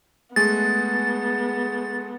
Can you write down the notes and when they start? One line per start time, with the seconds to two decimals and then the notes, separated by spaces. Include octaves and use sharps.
0.36 G#3 A3 B3 G#4 A6